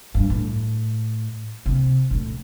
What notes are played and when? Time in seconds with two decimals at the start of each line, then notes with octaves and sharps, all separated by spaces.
0.15 G2
0.30 A2
1.66 C3
2.11 A2